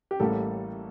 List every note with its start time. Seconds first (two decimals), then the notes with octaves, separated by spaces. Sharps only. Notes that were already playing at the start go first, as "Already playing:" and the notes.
0.11 G4
0.20 A1 A2 G3 A#3 A4